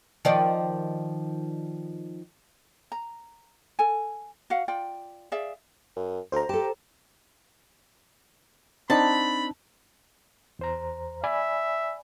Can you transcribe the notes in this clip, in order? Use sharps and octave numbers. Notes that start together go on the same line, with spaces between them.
D#3 F3 D5
A#5
A4 G#5
F#4 F5 F#5
F4 D5 G5
G#4 D5 E5 F5
F#2
D2 C5 A#5
G4 A4 A5
C4 D4 D#4 A5 B5
E2 C5 A#5
D5 E5 G#5 B5